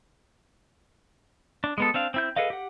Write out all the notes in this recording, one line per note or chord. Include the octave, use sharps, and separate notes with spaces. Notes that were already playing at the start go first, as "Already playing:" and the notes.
D4
G#3 B3 A4
C4 D4 F5
C4 E4 G6
G#4 A4 B4 D#5 F5
G4 F#5